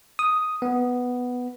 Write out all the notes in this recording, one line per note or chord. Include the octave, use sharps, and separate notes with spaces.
D#6
B3